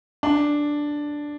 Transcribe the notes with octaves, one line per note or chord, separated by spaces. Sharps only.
D4